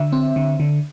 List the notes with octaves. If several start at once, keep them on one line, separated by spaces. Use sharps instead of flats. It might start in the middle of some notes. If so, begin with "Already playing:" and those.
Already playing: D3 E5
C4
D3
D3